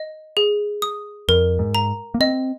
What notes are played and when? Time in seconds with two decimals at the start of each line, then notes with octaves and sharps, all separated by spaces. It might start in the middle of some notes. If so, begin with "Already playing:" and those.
Already playing: D#5
0.37 G#4
0.82 D#6
1.28 F2 A#4
1.59 G#2
1.75 A#5
2.14 A#3
2.20 C4 D#5